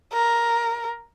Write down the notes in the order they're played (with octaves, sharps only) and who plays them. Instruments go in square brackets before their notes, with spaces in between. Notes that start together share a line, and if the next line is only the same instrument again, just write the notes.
[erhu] A#4